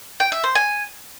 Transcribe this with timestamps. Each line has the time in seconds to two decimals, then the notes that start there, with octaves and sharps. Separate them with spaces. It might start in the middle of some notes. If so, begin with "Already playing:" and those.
0.20 G5
0.32 E5
0.44 C5
0.55 G#5